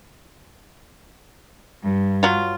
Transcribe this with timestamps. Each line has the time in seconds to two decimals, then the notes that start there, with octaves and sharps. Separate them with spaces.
1.82 G2
2.23 F#3 F4